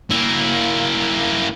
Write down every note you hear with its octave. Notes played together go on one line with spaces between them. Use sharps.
A#3 E4